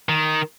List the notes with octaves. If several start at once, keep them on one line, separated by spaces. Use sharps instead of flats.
D#3